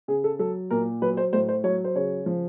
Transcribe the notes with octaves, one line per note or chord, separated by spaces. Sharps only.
C#3 G#4
A4
F#3 A4
A#2 A#4
F#3 B4
C5
A2 C5
C5
F#3 C#5
C5
C#3 C#5
F3